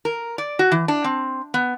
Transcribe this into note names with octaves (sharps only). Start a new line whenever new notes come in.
A#4
D5
F#4
E3
D4
C4
B3